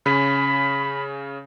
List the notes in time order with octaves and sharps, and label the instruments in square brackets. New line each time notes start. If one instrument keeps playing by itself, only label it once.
[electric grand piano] C#3 C#4 [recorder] B5